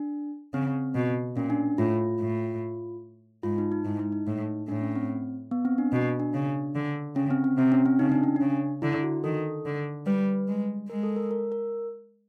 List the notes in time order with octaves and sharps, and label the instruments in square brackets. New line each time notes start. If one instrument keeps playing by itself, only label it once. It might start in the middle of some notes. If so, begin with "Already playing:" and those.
Already playing: [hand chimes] D4
[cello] C#3 [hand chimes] C4
[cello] B2
[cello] A#2 [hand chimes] C#4
[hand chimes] D4
[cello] A2 [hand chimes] F4
[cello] A2
[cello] G#2 [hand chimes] F4
[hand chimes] D#4
D#4
[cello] G#2 [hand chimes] E4
[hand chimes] D#4
D#4
[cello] A2 [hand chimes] D#4
[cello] A2 [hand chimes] D4
[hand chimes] C#4
C4
B3
C4
D4
[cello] B2
[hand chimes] D4
[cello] C#3
D3
[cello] C#3 [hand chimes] C#4
[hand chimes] C4
C4
[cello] C3 [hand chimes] C4
[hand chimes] C#4
C4
[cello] C#3 [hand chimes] D#4
[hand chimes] D4
C#4
[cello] C#3 [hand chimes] D4
[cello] D3 [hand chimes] E4
[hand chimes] F#4
[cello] D#3 [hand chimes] A4
[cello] D3
[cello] G3 [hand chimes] B4
[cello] G#3
[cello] G#3 [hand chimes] A#4
[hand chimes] A4
A#4
A#4
A#4